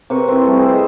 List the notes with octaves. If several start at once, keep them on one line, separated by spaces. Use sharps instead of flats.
C3 A#4 B4 C#6
C4 E4
G3 A3
G#4 B4 C5
D#5 E5